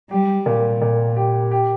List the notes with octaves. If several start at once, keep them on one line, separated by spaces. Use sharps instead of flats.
G3 G4
A#2
A#2
G4
G4